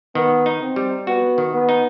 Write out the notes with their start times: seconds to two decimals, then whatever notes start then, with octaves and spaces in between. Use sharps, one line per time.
0.15 D#3 B3
0.46 D#4
0.62 C4
0.76 G3
1.07 B3 F#4
1.38 D#3
1.53 B3
1.69 D#4